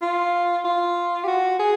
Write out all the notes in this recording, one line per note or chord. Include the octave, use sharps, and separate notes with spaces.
F4
F4
G4
F#4
G#4